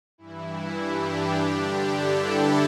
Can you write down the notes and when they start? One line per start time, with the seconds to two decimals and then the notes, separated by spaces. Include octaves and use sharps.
0.18 G2 E3 E4
0.78 D4 G4
1.36 G2 D3 D4 G4
1.96 E4 A4